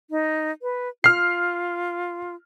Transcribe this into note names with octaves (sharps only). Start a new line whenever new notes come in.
D#4
B4
F4 F6 C7